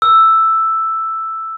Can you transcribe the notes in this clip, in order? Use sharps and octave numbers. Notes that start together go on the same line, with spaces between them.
E6